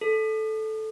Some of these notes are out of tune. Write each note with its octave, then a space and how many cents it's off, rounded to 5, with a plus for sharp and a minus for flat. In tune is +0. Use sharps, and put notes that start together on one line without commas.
A4 -10